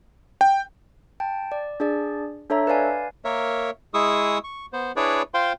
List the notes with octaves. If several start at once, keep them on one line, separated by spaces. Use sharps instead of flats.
G5
G5 A5
D5
D4 G#4 D5
D4 A4 C#5 E5 A#5
B4 D5 F5 G#5
A#3 A#4 C#5 E5
G#3 E4 G#4 C#6 D#6 E6
C#6
B3 C5
D4 E4 G#4 B4 C#5 D5
F4 C5 F5 G5 C6